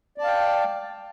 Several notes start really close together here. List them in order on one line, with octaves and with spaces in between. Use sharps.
D5 A5 F5 G5